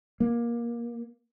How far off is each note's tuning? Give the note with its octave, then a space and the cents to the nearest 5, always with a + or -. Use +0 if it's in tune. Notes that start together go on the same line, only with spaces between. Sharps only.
A#3 +20